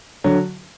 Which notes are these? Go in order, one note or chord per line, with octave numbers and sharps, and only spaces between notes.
D3 F#3